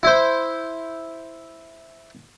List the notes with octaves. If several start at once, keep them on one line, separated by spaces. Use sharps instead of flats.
E4 C5